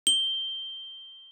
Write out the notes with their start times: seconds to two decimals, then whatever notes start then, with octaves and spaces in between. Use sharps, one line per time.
0.07 G7